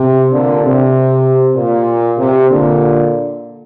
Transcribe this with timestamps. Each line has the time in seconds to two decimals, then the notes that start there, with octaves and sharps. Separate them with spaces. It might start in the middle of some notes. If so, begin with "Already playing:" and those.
Already playing: C3
0.32 A#2 D3
0.64 C3
1.56 A#2
2.18 C3
2.49 A#2 D3